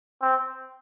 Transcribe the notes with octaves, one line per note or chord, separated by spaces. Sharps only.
C4